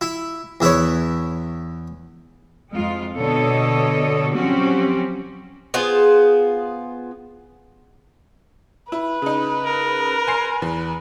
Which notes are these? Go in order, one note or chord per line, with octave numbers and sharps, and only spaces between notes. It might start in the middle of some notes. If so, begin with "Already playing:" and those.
E4
E2 E4 B4 C#5
F2 G#3 F4
B2 D3 A4 C#5 D#5
F3 F#3 C4 C#4 F#4 G4
B3 F4 G#4 C5
E4 B4
C#3 D#4
A#4
G#5 C6 C7
E2